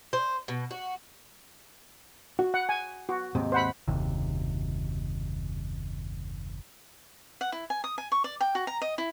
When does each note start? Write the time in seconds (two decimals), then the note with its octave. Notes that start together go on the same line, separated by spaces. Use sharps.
0.13 C5
0.48 B2
0.71 F#4
2.39 F#4
2.54 F#5
2.69 G#5
3.09 F#4
3.35 D#2 G#2 C3
3.52 C5 F#5 B5
3.88 F#1 D#2 C3
7.41 F#5
7.52 E4
7.70 G#5
7.84 D#6
7.98 G#5
8.12 C#6
8.24 D5
8.41 G5
8.55 F#4
8.67 A#5
8.82 D#5
8.98 E4